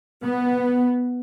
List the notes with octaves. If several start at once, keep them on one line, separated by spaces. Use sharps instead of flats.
B3